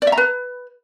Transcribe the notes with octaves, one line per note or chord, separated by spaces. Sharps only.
D5
E5
A#5
B4